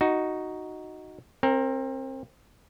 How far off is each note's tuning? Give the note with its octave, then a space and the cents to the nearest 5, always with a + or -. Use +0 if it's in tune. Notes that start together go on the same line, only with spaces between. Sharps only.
D#4 +0 F#4 +0
C4 +25 A#4 -10